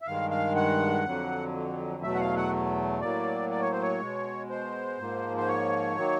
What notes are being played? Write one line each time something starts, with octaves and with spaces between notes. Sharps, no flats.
E5
G2 D#3 G#3 F5
F5
F#5
F2 D3 F#3
E2 B2 F#3 A3 E5
F#5
F5
F#5
A2 F#3 A#3 D5
D5
C#5
C5
C#5
B2 G#3
C5
G#2 F3 A#3
C5
C#5
D#3 F#3 A#3